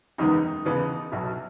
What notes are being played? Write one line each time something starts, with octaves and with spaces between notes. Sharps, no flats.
F#1 E2 D#3 G#3 B3 D#4
D#2 C#3 E3 B3
B1 B2 F#3 E4